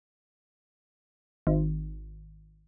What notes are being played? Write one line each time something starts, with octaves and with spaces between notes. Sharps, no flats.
G#1